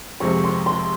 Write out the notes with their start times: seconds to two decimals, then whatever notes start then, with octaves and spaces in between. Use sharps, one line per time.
0.20 F2 C3 F3 G#3 C4 C#6
0.44 C6
0.66 C6